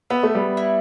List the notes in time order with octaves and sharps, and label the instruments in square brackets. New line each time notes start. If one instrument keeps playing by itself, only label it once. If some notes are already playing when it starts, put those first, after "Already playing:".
[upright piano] B3 [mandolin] E5
[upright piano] A3
G3 B3
[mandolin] E4